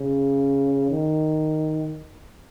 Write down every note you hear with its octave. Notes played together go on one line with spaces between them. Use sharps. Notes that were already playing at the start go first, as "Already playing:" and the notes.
Already playing: C#3
D#3